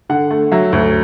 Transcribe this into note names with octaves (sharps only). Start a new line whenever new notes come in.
D3 F#5
A3
F#3 E5
D2